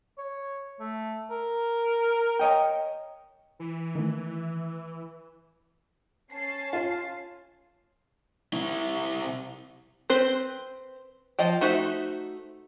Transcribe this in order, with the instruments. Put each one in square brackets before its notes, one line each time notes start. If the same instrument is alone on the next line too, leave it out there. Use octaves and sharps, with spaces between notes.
[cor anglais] C#5
A3
A#4
[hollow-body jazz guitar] C#5 D#5 G5
[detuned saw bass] E3
[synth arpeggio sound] D#3 A3
[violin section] C#4 A5 C7
[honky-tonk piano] F4
[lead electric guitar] C3 E4
[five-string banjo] C4 B4 C5
F3 D#5 G5
A3 D#4 F#4 C5 E5